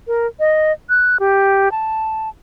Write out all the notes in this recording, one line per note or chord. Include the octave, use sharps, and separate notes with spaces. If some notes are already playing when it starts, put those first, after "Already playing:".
A#4
D#5
F#6
G4
A5